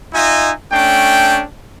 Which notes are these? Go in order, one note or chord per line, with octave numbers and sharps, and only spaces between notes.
D#4 F4 D#5 E5 G#5
A3 C#4 D4 G5